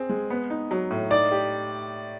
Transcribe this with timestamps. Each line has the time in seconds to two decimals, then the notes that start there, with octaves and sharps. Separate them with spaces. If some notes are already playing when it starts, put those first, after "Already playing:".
Already playing: C4 G#4
0.09 G#3
0.30 B3
0.50 D#4
0.71 F#3
0.91 A2
1.11 D#4 D5
1.31 G4